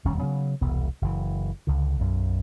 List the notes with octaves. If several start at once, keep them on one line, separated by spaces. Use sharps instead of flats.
E1 D#2 G3 C#4
C#3 F#3 B3
E1 C2 B3
F#1 E3
C#2 D3
B1 F#2